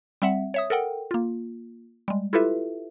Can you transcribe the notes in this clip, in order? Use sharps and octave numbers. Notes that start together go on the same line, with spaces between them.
G3 C4 E5 F#5
C#5 E5 D#6
A4 A#4 F#5 G5
A#3 F4
G3 G#3
E4 F4 G4 A4 B4 E5